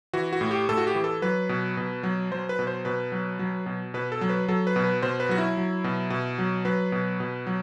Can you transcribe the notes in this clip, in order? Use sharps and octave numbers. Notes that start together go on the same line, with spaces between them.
E3 F#4
F#4
A2
G4
A2 A4
F#4
G4
E3
A4
F#3 B4
B2
B2
F#3
F#3 C5
B4
B2
C5
B2 B4
F#3
F#3
B2
B2 B4
A4
F#3
B4
F#3 A4
B4
B2
B4
B2 C5
B4
F#3 F#4
E4
F#3
B2
B2
F#3
F#3 B4
B2
B2
F#3